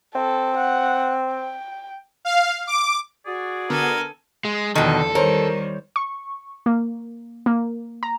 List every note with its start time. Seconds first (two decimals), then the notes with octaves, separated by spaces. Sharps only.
0.15 C4 A4
0.57 F#5
1.32 G5
2.25 F5
2.67 D6
3.26 F#4 G#4 D5
3.70 D3 B3 A4 A#4 G#5
4.45 G#3
4.75 E2 B2 D3 D#3 F3 A4
5.15 D#3 G3 A#4 C5 C#5
5.96 C#6
6.66 A#3
7.46 A#3
8.03 A#5